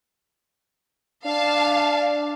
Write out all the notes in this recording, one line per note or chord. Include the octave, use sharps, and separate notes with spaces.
D4 F5 A5